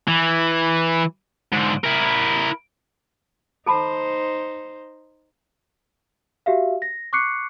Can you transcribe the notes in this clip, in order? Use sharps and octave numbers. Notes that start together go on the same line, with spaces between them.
E3
G#2 D3
E4 A#4
D#4 A4 C5 A5 B5
F#4 G4 E5 F5
A#6
C#6 D6 F#6 C7 C#7